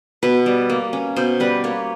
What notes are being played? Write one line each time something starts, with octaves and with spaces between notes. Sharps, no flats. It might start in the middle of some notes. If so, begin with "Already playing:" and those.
B2 B4
G3
A#3
C#4
B2 C5
G3 B4
A#3 C#5